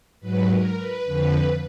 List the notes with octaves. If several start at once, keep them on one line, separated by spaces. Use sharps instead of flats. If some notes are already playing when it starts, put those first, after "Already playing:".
G#2 F#3 B4
A#4
B4
F2 D3 F3 B4